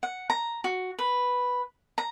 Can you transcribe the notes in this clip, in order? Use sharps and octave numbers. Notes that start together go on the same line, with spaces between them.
F#5
A#5
F#4
B4
A#5